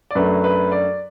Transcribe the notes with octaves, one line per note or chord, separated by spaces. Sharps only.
D5
F#2 F#3 A3 D4 B4
B4
D5